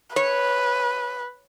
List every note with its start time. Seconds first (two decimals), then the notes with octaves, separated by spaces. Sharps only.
0.16 B4 C#5